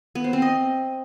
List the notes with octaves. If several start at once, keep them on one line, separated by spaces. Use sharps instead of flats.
B3
C5
C4
D#5